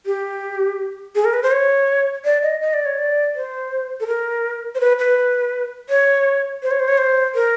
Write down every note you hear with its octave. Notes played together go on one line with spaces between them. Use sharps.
G4
G#4
A#4
B4
C5
C#5
D5
D#5
D#5
D5
C#5
D5
C5
A4
A#4
C5
B4
B4
C#5
C5
C#5
C5
C#5
C5
A#4